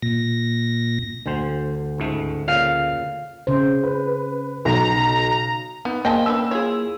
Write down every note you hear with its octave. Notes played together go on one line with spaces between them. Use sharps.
A#2 A#6
D2 D3 C5
C#2 G#2 A3
A#2 C#3 F5
C#3 C5
B4
B1 A#5
B3 D#4
F3 G#3 A#3 D#5 G5 A5
C#4 D4 B4 E6
E4 F4 G#4 C#5